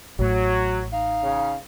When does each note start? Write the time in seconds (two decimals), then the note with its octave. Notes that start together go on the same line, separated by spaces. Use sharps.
0.19 A1 A2 F#3
0.91 D#4 F5
1.23 C#3